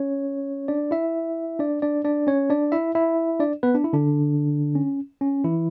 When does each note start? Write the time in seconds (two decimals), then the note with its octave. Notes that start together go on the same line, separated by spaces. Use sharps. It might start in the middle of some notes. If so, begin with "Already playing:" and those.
Already playing: C#4 C#5
0.68 D4 D5
0.91 E4 E5
1.59 D4 D5
1.82 D4 D5
2.05 D4 D5
2.27 C#4 C#5
2.50 D4 D5
2.72 E4 E5
2.95 E4 E5
3.40 D4 D5
3.63 B3 B4
3.75 D4
3.84 E4
3.93 D3 D4
4.75 C#4
5.21 C#4
5.44 E3 E4